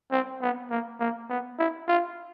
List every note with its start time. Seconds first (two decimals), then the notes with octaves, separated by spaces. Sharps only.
0.12 C4
0.42 B3
0.70 A#3
1.00 A#3
1.29 B3
1.59 E4
1.88 F4